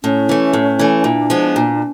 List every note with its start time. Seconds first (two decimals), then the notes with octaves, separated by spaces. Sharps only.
0.03 A2 C#4
0.29 E3 A3
0.53 A2
0.79 E3 A3
1.04 A#2 D4
1.30 F3 G#3 B3
1.56 A#2